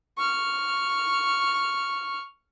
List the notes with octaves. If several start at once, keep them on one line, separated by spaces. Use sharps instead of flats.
C#6 F6